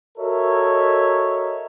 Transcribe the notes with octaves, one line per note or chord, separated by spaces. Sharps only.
F#4 A4 A#4 C#5 D#5 E5